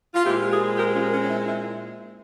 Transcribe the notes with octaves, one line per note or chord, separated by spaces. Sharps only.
F4
A#2 G#3 C4 E4 G4
F4 G#4
G4 A#4
C#4 F4
C#4
C#4
E4
E4